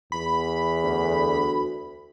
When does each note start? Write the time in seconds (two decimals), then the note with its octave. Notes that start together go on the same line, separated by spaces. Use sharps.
0.12 E2 B5
0.84 D2